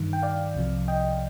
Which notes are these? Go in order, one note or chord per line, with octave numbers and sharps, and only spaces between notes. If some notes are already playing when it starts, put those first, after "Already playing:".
Already playing: G2 D#3
G5
D5 F5
C2 C3 F3
D#5 G5